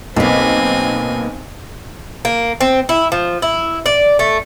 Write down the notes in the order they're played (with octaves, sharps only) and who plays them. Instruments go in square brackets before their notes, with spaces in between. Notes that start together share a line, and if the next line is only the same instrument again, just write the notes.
[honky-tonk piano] B1 [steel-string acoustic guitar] A#3 B4 [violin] C4 G#5
[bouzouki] A#3
C4
E4
F3
E4
D5
A3